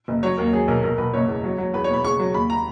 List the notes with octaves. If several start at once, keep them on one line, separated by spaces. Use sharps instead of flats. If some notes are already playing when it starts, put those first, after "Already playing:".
F#1
F#3 C#5
D#2 A#4
F#3 G#4
B1 A#4
B1 A#4
B1 B4
F#1 C#5
E2
F#3
F#3
E2 B4
C#5
B2 B5
C#3 C#6
F#3
D#2 B5
A#5